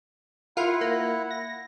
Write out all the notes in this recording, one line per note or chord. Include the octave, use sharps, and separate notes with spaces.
E4 F4 A#4 F5 F#5
A#3
A#6